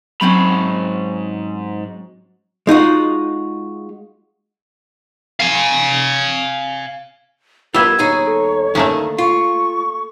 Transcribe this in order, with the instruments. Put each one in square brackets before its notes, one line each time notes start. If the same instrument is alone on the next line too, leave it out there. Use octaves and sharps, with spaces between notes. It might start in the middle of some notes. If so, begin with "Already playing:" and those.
[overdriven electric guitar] G#2 B5 [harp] F#3 C4 C#4
[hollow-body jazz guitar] G#3 D#4 F4 F#4
[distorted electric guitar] F5 G#5
[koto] G3 B3 [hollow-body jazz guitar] F4 E5 [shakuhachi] A#4 [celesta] E6 G#6
[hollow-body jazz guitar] D#2 D#4 G#4 [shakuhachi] C#5
[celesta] A4
[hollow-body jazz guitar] D2 D#3 [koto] A3 A#3 C#4
[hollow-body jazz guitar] F4 [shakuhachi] C#6